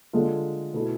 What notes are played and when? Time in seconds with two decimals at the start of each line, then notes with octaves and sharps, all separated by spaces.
0.13 D3 G#3 D4 F4 A4
0.73 B2 A3 E4 A4